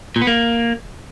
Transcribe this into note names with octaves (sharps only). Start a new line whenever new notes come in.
A#2
B3
A#3